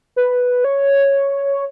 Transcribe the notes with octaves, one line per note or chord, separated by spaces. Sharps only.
B4
C#5